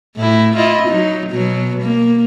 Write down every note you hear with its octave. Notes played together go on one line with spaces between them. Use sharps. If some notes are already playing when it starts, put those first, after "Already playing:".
A2 E4
E4 F4 D#5
F#3 D#4
B2 F#3
A#3